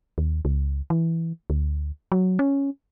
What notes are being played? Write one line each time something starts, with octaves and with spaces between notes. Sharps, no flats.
D#2
C#2
E3
D2
F#3
C#4